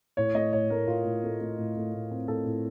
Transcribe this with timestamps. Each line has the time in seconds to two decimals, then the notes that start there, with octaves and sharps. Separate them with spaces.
0.17 A2 C#5
0.34 A3 D#5
0.53 A2 C#5
0.70 A3 A#4
0.87 A2 F4
1.05 A2
1.23 A3
1.41 A3
1.58 A2
1.76 A3
1.94 A2
2.11 C4
2.28 A2 A4
2.45 A2